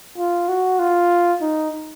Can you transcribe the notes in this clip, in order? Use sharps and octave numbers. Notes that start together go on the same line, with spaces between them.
F4
F#4
F4
D#4